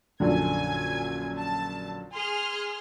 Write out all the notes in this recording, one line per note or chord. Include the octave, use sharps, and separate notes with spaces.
A#1 F#2 D3 G#5 G#6
A5
G#4 C6 F6